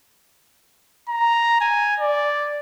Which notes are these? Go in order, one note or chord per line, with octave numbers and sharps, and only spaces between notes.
A#5
G#5
D5